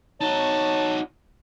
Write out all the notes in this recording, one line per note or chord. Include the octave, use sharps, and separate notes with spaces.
D#4 F#4 C#5 A5